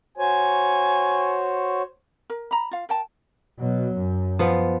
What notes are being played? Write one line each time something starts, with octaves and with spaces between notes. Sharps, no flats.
F#4 C5 C#5 G#5
A#4
A#5 B5
F4 F5
A#4 G5 A5
B2 F#3
F#2
F3 B3